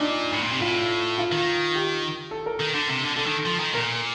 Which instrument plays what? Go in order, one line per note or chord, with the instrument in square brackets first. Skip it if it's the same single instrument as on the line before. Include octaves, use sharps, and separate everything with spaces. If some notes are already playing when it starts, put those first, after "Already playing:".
Already playing: [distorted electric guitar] A#2 [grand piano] D4 D#4
[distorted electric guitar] A2
A#2
C3
[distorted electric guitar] A2 [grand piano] F4
[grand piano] F4
[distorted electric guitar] D#3
[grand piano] G4
A4
A#4
[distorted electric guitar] D#3
D3
C3
D3
[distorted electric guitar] D3 [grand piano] A4
[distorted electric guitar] D#3
F3
D#3
[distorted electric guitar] A#2 [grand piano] A#4